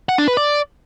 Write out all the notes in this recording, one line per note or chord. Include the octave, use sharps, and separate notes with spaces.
F#5
D4
B4
D5